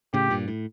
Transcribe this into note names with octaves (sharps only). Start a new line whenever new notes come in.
A2 C#3 G4
G2 A#2
A2